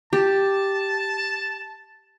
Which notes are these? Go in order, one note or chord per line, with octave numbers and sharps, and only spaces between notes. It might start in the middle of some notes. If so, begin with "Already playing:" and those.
G4 A5